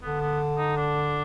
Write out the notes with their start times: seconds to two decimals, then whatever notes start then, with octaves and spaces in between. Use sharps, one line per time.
0.02 D3 B3
0.21 B3
0.58 D#4
0.77 D4